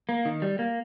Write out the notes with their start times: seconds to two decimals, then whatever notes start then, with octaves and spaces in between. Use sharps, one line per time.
0.09 A#3
0.25 D#3
0.42 G3
0.59 A#3